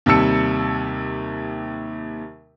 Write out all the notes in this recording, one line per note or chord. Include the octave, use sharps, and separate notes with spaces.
D#2 C3 G3 A5 E6 C#7